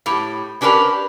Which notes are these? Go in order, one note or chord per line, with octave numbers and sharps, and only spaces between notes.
A2 G4
C#4 D4 G4 A#4 B4